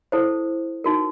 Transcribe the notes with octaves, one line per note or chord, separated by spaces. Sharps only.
E4 A4 C5
D#4 F#4 A#4